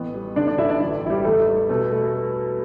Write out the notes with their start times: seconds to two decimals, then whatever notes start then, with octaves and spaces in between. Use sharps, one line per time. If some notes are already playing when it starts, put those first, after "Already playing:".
Already playing: A1 B3
0.14 G3
0.36 D3 D4 D5
0.47 D4 D5
0.58 G1 E4 E5
0.69 D4 D5
0.80 A1 E4
1.02 A1 E4
1.10 G3 G4
1.25 E2 A3 A4
1.47 G3
1.69 B2 A3 A4
1.92 A3